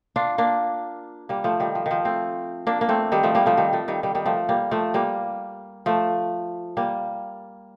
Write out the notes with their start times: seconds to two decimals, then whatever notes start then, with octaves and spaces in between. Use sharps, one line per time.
0.16 D4 F4
0.38 A#3 D4
1.29 G3 A#3
1.44 F3 A3
1.60 D#3 G3
1.75 F3
1.86 D#3 F3
2.05 A3 C4
2.67 A#3 D4
2.81 A#3
2.89 A3 C4
3.12 D#3 G3
3.23 F3 A3
3.35 G3 A#3
3.46 F3 A3
3.57 D#3 G3
3.73 F3 A3
3.88 D#3 G3
4.03 D#3 G3
4.15 D#3 G3
4.26 F3 A3
4.49 G3 A#3
4.71 F3 A3
4.94 G3 A#3
5.86 F3 A3
6.77 G3 A#3